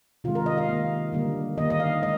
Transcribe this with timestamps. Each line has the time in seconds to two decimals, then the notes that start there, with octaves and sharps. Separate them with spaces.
0.24 C3 D#3 G#3 F4
0.35 A#4
0.46 D#5
0.58 F5
0.69 D#3 A#3
1.13 D3 G3 A#3
1.57 D#3 A#3 D#5
1.70 D#5
1.80 F5
2.02 G#3 D#5